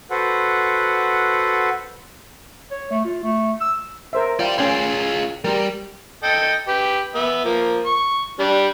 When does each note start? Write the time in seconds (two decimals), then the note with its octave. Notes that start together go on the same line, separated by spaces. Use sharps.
0.11 F#4 A4 B4 C5 F#5
2.71 C#5
2.91 A3
3.04 F4
3.23 A3
3.61 E6
4.13 A#4 C5 E5
4.39 F4 D5 G5
4.58 C#4 F4 G#4 G5 C6
5.44 G3 G4 A#4
6.23 A4 D#5 G5
6.68 G4 B4
7.15 B3 E5
7.44 F3 A#3
7.86 C#6
8.39 G3 D4